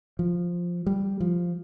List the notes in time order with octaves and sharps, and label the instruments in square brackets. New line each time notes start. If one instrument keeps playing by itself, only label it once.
[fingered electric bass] F3
G3
F3